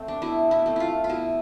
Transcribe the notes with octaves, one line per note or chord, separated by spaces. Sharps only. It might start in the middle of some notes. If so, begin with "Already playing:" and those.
Already playing: A3 C4
D4
B2 E4
E4
A3 C4
E4 F4
F4
B2 E4